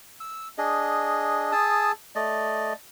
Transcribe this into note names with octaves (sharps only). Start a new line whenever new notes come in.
E6
D4 G#4 D#5
G#4 A5 D#6 E6
A3 D5 D#5